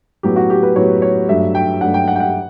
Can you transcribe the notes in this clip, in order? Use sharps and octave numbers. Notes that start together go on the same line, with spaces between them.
A2 F#3 B3 G4
F#4
G4
B4
A2 F#3 B3 C#5
C#5
G2 F#3 A3 E5
G5
G2 F#3 A3 F#5
G5
F#5
G5
F#5